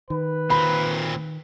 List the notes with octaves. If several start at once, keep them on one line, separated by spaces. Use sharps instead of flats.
D#3 B4
A#2 C4 B5